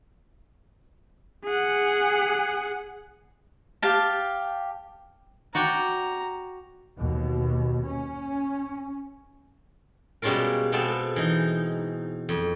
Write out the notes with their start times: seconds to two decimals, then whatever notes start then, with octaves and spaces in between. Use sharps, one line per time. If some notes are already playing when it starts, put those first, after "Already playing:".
1.45 G#4 F#5
3.82 G4 F5 A5
5.55 F#4 D5 G5 A#5
6.98 D#2 B2
7.88 C#4
10.22 B2 G3 G#3 C#4 F4 A#4
10.72 B2 G#3 B3 C4 A4 A5
11.16 E3 D#4
12.29 F2